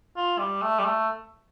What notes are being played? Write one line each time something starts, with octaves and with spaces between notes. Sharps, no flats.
F4
G3
A3
G3
A3